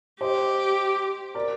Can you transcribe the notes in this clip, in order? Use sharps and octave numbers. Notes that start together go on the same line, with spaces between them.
G4 C5 D#5
A#4 D5